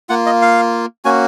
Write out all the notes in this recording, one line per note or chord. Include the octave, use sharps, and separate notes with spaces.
A#3 F4 F#5
D#5
F5
A#3 C#4 F#4 G#5